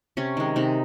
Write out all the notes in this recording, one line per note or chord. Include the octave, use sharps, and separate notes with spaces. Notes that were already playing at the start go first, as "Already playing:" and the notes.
C3 C#4
D#3 G#3
C3 D#4